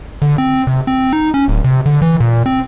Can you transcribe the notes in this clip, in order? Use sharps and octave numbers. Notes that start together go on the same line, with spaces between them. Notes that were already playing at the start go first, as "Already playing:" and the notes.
D3
C4
C3
C4
D#4
C#4
D1
C3
D3
E3
A#2
C4